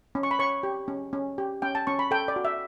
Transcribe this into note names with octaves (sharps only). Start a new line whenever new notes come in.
C#4
C#6
B5
C#5 C#6
G4
C#4
C#4
G4
C#4 G5
A5
C#4 C#6
B5
A4 G5
D5
F#4
E5